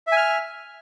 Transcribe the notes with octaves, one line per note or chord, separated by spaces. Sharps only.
E5 G#5 F6